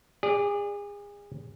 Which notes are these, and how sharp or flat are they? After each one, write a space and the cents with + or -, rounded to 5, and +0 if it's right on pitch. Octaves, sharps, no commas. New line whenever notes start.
G#4 -30 D5 +0